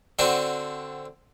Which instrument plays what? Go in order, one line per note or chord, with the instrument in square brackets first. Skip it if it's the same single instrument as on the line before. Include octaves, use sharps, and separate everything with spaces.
[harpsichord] D3 C4 D4 F#4